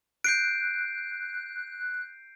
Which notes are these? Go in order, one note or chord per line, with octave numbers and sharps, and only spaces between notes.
F#6 G6 C7 D7